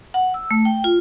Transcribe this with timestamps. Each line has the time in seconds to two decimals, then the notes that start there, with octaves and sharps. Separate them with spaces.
0.14 F#5
0.34 E6
0.51 A3
0.65 G5
0.84 F4